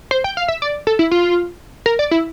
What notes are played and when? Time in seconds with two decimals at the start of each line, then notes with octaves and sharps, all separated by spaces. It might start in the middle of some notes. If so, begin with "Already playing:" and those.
0.11 C5
0.24 G5
0.37 F5
0.48 E5
0.62 D5
0.87 A4
0.99 E4
1.11 F4
1.86 A#4
1.99 D5
2.11 E4